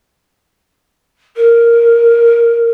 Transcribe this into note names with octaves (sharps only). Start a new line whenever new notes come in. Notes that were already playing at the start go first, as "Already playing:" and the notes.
A#4